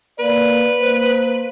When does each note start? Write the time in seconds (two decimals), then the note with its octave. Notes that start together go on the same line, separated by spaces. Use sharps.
0.20 A#3 B4 D5
0.81 A#3 C5